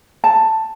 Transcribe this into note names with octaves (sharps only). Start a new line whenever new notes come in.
A5